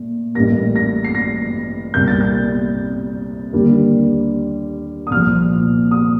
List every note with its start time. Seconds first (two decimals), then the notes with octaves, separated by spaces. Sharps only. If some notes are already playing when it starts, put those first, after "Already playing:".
Already playing: A#2 A3
0.35 A1 A2 G3 A#3 A#6
0.76 A#6
1.04 C7
1.15 A#6
1.94 C2 C3 G3 A#3 G6
2.08 A6
2.21 G6
3.53 D#2 D3 G3 A#3
5.07 D#6
5.11 C2 A#2 F3 F6
5.91 D#6